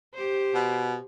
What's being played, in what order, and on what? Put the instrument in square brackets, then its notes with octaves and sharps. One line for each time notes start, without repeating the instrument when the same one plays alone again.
[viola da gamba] G4 C5
[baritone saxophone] B2